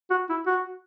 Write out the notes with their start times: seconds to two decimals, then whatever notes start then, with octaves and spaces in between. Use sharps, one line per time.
0.10 F#4
0.30 E4
0.47 F#4